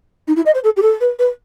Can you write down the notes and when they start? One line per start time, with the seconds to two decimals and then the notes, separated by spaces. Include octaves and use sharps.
0.27 D#4
0.36 E4
0.45 D#5
0.54 C5
0.64 A4
0.76 G4
0.82 A4
1.00 B4
1.19 B4